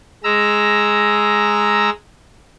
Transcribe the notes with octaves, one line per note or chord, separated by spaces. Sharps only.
G#3 A#5 E6